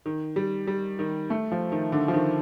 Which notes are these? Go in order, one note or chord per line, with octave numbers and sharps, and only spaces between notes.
D#3
G3
G3
D#3
A3
F3
D#3
D3
F3
D#3